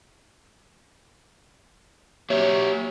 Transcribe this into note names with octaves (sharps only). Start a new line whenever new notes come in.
F#3 A#3 G4 C#5 E5